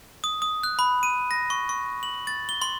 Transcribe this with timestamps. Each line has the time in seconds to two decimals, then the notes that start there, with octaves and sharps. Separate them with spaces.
0.24 D#6
0.42 D#6
0.63 F#6
0.79 B5
1.03 D#7
1.31 A#6
1.50 C#6
1.69 C#6
2.03 F#7
2.27 A6
2.49 G7
2.62 C6